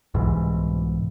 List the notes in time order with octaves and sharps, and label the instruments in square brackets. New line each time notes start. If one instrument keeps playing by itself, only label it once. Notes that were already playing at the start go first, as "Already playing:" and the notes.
[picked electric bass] C2 G#2 B2 E3